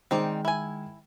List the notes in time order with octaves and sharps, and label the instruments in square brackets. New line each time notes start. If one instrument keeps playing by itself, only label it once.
[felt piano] D#3 G#3 [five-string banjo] C4 D#4 D5
[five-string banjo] E4 G#5